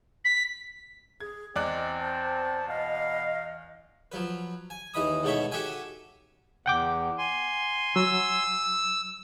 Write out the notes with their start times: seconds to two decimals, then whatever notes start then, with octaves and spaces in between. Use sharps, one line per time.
0.24 B6
1.20 G#4 G#6
1.56 E2 C4 D5 D#5 F#6
2.01 C5 A5
2.68 B2 D#5 F5
4.12 F3 F#3 B4
4.70 G#5
4.94 D#2 E3 D#5 B5 D#6
5.23 G#2 B2 A3 C#5 E5 B5
5.52 F#4 G4 A4 E5 G5 G#5
6.66 E2 F#5 G5 D6
7.18 G#5 C6
7.96 F#3 E6